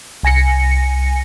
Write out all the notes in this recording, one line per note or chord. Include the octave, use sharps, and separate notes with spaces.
C2 G#5 A#6 C#7